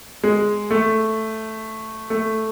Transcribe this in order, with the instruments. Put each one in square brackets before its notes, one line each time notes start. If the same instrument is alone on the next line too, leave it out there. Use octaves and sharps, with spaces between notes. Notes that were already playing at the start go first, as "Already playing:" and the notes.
[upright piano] G#3
A3
A3